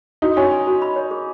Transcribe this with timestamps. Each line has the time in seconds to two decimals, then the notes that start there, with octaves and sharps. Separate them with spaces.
0.22 D#4 F#4
0.36 C#4 F#4
0.51 G#5
0.67 F#4
0.82 B5
0.96 C#5
1.11 G#4